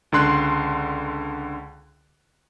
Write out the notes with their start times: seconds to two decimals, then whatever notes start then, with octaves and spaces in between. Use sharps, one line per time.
0.12 C#2 D3 C6 F#6